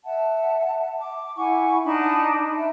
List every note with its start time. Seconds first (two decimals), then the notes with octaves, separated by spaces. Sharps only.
0.05 E5 F#5 A5
1.00 D6
1.37 E4 F#5 G#5 C#6
1.84 D4 D#4 A5 B5
2.54 E5